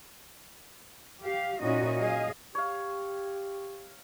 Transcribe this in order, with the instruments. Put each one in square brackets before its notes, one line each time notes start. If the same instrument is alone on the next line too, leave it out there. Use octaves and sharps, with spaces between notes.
[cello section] G4 F5
A#2 C#4 D#4 E4 F#4 D#5
F#3 G#4 D#5 F5
[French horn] G4 [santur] C#5 F5